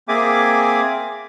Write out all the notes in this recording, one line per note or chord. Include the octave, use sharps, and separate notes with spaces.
A#3 C4 G#4 E5 G#5 D6